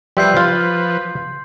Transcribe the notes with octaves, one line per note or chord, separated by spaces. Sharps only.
F3 G3 B4 E5 C6 G6 C7
F4